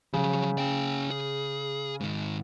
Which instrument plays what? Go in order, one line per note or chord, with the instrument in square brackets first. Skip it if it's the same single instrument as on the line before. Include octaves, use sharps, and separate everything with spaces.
[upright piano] C#3 [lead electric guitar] F3 F#3
[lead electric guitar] C#4 G5
G#4
G#2 D#3